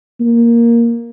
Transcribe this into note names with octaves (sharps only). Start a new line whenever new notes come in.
A#3